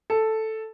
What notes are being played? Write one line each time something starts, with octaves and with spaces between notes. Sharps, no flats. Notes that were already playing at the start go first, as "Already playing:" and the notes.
A4